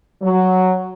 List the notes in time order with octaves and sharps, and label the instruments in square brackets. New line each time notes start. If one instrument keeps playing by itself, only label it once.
[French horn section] F#3